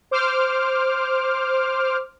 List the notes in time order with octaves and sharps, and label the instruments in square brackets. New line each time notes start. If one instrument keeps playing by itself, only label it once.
[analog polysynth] C5 D6 F6